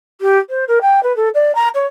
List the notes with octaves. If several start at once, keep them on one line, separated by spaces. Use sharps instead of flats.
G4
C5
A#4
G5
B4
A4
D5
A#5
C#5